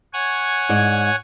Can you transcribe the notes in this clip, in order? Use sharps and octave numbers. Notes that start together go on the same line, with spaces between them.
C#5 F#5 G#5
G#2 D5